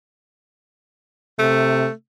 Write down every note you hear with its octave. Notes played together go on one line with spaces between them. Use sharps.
C3 A3